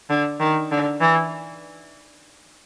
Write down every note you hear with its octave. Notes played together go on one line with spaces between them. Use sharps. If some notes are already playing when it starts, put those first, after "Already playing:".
D3
D#3
D3
E3